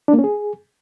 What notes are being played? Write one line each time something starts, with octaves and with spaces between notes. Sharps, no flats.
D4
A#3
C#4
G#4